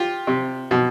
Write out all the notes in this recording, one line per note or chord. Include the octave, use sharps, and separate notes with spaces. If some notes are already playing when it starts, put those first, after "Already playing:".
Already playing: F4 G4
C3
B2